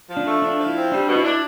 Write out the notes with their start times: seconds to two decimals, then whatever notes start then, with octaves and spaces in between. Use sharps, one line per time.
0.09 F3
0.17 D4
0.25 A3
0.42 F3 D4
0.59 F3
0.67 E4
0.75 C4
0.92 G3 D4
1.08 B2
1.16 E4
1.25 D4